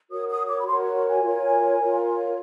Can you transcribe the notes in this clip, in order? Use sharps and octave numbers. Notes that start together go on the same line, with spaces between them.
F#4 A#4 C#5 D#6
D#6
D6
B5
F#4 A#4 C#5 C6
C#6
G#5
F4 A#4 C#5
F4 A#4 C#5